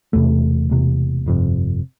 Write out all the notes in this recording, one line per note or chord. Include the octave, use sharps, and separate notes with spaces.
E1 E2 C3 A3
E1 E2 C3
G1 F2 C3